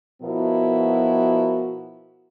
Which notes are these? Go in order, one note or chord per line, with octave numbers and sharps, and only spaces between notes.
B2 F3 B3 E4 F#4 A#4